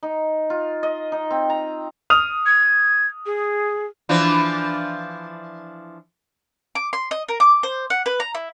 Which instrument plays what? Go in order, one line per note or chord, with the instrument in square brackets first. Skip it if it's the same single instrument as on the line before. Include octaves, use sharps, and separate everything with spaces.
[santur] D#4
F4
D#5
D#4
C4
A#5
[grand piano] D#6 F6 F7
[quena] G#6
G#4
[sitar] E3 F3 D4
[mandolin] D6
C6
D#5
A#4
D6
C5
F#5
B4
A#5
E4